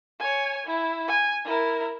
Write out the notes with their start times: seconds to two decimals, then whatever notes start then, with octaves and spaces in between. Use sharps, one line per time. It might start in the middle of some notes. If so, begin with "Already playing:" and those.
0.20 C#5 G#5
0.67 E4
1.08 G#5
1.45 E4 A#4